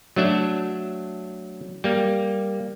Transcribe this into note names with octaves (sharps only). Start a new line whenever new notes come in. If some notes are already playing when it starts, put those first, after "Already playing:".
F#3 A3 D4 E5
G3 A#3